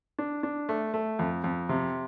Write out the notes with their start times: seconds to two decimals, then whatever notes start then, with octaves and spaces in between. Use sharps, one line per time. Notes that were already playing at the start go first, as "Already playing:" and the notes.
0.19 D4
0.43 D4
0.69 A3
0.94 A3
1.19 F2
1.44 F2
1.69 C3